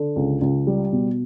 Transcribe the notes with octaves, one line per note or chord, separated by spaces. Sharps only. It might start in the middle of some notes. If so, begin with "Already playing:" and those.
Already playing: D3
C#2
C#2
G3
B2